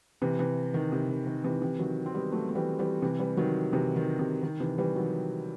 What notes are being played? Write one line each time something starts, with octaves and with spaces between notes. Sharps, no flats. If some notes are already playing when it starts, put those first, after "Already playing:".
C3 E3
C3 E3
D#3
C3
D#3
D#3
C3 E3
C3 E3
D#3 F#3
C4
G3 B3
F#3 A3
A3
E3 G3
E3 G3
C3 E3
E3 G3
D#3 F#3
C3 E3
D#3
C3
D#3
C3 E3
E3 G3
D#3 F#3